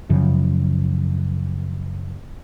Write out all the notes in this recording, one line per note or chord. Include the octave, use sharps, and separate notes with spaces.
F#2 C#3 F3